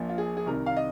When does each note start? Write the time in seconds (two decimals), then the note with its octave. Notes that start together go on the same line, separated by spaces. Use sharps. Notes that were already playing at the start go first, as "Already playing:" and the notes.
Already playing: A#1 A#2 F3
0.09 F4
0.18 G#4
0.37 G#4
0.46 C2 C3 D#3 A#4
0.66 F5
0.77 D#5